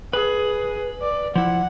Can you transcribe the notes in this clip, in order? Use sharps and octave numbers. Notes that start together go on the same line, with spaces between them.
G#4 B4
D5
F3 E4 F#5